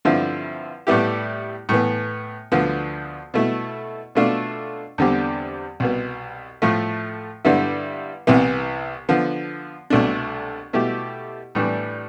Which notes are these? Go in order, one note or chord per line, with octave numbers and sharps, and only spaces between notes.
G2 D3 F3 C4 E4
A2 G3 B3 E4 G4
A2 E3 B3
D2 D3 F3 B3
B2 A3 E4
B2 A3 D4 F4
E2 D3 G3 C4 G4
C2 B2 B3
A2 F3 A3
G2 D3 G3 B3 E4
C2 C3 E3 B3 E4
D3 F3 B3
C2 B2 A3 D4
B2 A3 E4 G4
A2 E3 G3 D4